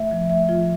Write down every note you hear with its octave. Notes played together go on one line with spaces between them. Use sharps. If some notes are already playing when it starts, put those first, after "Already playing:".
Already playing: A3 E5
F3
A3 E5
F3 F4